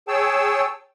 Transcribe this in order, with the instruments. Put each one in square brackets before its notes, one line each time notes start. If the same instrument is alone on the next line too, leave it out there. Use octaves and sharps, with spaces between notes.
[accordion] G#4 C#5 G5 A5 E6